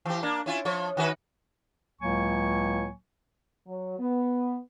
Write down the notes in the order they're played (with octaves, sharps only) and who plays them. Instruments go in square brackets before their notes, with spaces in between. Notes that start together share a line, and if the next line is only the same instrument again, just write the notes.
[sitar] E3 G4
A#3 D4
C#4 E4 F4
F3 C#5
D#3 F#4 B4
[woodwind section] C#2 A2 F#3 A#3 G#5 C#6
[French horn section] F#3
B3